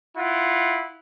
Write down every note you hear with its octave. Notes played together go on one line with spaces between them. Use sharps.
E4 F4 F#5